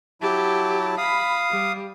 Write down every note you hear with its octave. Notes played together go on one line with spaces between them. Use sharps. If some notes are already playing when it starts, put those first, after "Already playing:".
F#3 E4 G4 A5
F5 B5 D#6
G3